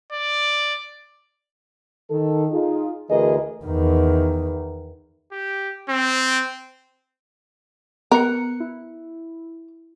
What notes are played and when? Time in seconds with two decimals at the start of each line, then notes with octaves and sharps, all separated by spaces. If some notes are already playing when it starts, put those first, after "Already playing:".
0.12 D5
2.10 D#3 A4
2.51 D#4 F4 G#4
3.09 D2 E3 G#4 A#4 B4 D#5
3.65 E2 D#3
5.32 G4
5.89 C4
8.12 B3 A#4 F#6 C#7
8.60 E4